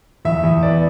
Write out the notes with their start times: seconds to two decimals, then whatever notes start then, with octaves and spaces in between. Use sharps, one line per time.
0.25 E2 E5
0.43 E2
0.63 B3 D5